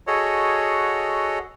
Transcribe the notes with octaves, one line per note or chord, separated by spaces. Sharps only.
F#4 G#4 A4 C#5 D#5 F#5